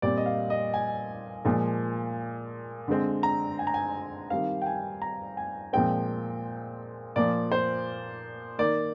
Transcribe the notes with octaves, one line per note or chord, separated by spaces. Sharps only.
A#2 G3 C4 D5
D#5
F5
D#5
G#5
A#2 F3 G#3
D3 G#3 C4
A#5
G#5
A#5
G#5
D#3 G3 C4 F5
G5
G#5
A#5
G#5
A#2 F3 G#3 C4 G5
A#2 F3 A#3 D5
C5
D#3 A#3 D5